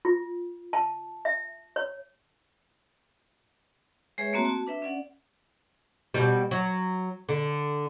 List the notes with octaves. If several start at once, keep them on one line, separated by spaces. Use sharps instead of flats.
F4
A5
E5
C#5
G#3 G#4 B4 C#5 E5
A3 A#3 C4 F#4 A#5
F#4 A5
D4 B4 E5
C#4 D5 F#5
B2 G3
F#3
D3